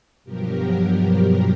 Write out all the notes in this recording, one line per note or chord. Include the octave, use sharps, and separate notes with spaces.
G2 B2 F3 F#3 G4 A#4